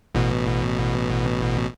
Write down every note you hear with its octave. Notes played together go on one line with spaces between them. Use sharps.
A1 B2